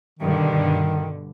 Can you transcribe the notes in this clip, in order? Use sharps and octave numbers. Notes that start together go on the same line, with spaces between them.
G2 B2 D3 D#3